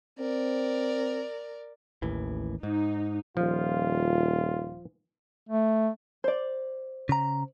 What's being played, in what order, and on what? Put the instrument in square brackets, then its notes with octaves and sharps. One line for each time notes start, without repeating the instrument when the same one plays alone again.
[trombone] C4 [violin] A#4 D5
[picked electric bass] A1 D#2 E3
[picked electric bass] G#2 [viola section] D#4
[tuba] D#1 [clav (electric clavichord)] F3 [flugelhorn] F4
[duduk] A3
[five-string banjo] C5 D5
[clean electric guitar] C#3 A#5